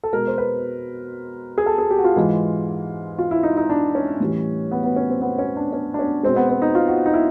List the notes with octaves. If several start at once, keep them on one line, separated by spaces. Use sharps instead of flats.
A4
B2 G#3 A#4
C5
B4
G#4
A4
G#4
G4
F#4
F4
G#2 E3 G#3
F4
E4
D#4
D#4
D4
C#4
A2 E3 G3
B3
B3
C#4
C4
B3
C#4
D4
C#4
D4
C#4
B2 G#3 C4
B3
C4
D#4
F4
F#4
D#4
E4